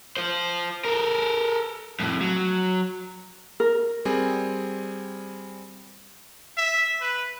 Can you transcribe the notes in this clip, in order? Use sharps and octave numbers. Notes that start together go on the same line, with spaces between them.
F4 C5
A4 A#4
F2 A2
F#3
A#4
G3 C4 G#4
E5
B4